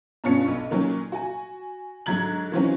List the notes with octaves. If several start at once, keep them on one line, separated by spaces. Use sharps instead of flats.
G2 B2 C#4 F4 C#7
B1
A#2 D#3 F#3 C#4
F#4 G#5
G#2 D3 F#3 A#5 G#6 F#7
D#3 E3 F#3 C4 C#4 F#4